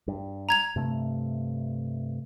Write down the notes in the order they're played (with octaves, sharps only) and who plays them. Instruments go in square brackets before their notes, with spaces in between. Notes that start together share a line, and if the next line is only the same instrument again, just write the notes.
[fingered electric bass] G2
[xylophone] A#5 G#6 F7
[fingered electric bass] G2 C3 A3